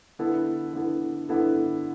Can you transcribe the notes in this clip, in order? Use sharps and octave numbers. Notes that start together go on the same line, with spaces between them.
D3 B3 E4 A4
D3 B3 E4 A4
D3 B3 E4 A4